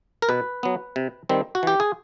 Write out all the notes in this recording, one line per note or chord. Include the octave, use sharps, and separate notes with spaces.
A#4
B2 B4
F#3 B3
C3
D#3 G3 C4
F#4
E3 G4
G#4